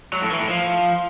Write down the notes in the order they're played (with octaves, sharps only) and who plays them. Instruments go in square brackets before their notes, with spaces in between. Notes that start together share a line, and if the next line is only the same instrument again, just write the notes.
[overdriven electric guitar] F#3
A2
E3
A2
F3